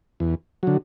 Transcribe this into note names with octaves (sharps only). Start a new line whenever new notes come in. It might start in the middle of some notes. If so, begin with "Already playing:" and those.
E2
D3 F#3